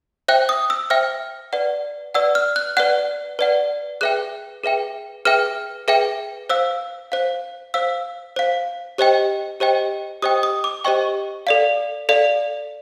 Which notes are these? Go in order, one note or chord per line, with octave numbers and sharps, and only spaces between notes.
C5 E5 G5 F#6
D#6
E6
C5 E5 G5 F6
B4 D5 F#5
B4 D5 F#5 E6
F6
F#6
B4 D5 F#5 F#6
B4 D5 F#5
G#4 B4 E5 G5 F#6
G#4 B4 E5 G5
G#4 B4 E5 G5 F6
G#4 B4 E5 G5
C5 F5 E6
C5 F5
C5 F5 E6
C5 F5
G4 C5 D#5 G5
G4 C5 D#5 G5
G4 C5 D#5 G5 D#6
D#6
D6
G4 C5 D#5 G5 C#6
A4 D5 F5
A4 D5 F5